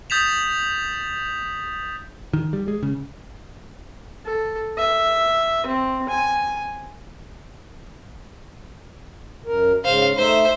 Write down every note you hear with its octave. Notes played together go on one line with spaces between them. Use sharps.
D#6 G6 A6 B6 E7 F7
D#3
G3
G#3
C#3
A4
E5
C4
G#5
F#2 A#4
G#2 C#3 C5 F5
A3 D#4 C5 E5